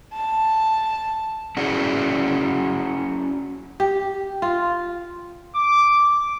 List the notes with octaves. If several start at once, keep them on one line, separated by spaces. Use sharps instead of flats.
A5
C#4 E4 F#4 G#4 D5
G4
F4
D6